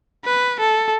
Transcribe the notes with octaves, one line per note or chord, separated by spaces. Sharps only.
B4
A4